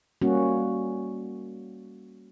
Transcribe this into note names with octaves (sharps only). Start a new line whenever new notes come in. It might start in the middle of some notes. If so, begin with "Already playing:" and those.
G3 A#3 C#4 F#4